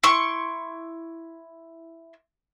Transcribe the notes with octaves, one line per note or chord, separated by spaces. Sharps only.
E4 C6 C#6